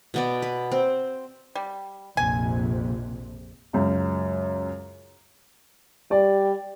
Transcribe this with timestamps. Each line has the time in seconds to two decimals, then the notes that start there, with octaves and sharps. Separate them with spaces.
0.14 B2 B3 D5
0.42 B4
0.72 C4
1.55 G3
2.17 A#1 F2 C3 G#5
3.73 C#2 F#2
6.11 G3 D5